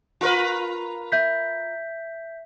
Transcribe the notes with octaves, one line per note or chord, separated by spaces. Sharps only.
F4 A#4 B4
E5 G6 B6